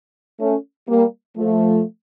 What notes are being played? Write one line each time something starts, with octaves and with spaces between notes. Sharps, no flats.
A3 C#4
G3 A#3
F3 A3